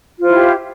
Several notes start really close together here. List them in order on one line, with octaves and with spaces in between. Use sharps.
F4 C5 E4 G4